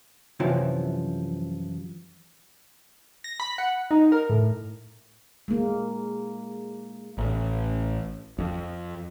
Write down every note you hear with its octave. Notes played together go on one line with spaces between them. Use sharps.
F#2 C3 E3 F3
A#6
B5
F#5
D#4
A#4
A2
G#3 A#3
A1
F2